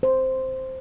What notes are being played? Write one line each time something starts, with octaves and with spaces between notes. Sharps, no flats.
C5